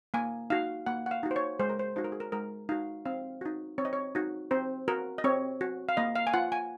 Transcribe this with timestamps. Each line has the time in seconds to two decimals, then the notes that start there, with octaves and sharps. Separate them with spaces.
0.14 A#3 G#5
0.50 D#4 F#4 F5
0.86 A#3 F#5
1.06 F#5
1.11 F5
1.23 D#4 F#4
1.31 C5
1.36 C#5
1.60 G#3 C5
1.69 A#4
1.79 C5
1.96 D#4 F#4 C5
2.04 A#4
2.12 G#4
2.20 A#4
2.32 G#3 A#4
2.69 D#4 F#4 F5
3.06 C4 F5
3.41 D#4 F#4
3.78 C4 C#5
3.85 D#5
3.93 C#5
4.15 D#4 F#4
4.51 C4 C5
4.88 F#4 A#4
5.18 D#5
5.24 C4 C#5
5.61 F#4
5.89 F5
5.97 A#3 D#5
6.15 F5
6.27 G#5
6.34 F4 F#5
6.52 G#5